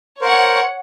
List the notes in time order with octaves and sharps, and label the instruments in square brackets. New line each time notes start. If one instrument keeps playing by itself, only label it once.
[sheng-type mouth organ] A#4 C5 [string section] C#5 F#5